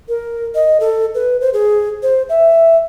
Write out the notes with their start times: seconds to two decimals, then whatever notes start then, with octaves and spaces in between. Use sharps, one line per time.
0.08 A#4
0.55 D#5
0.80 A4
1.15 B4
1.41 C5
1.53 G#4
2.03 C5
2.29 E5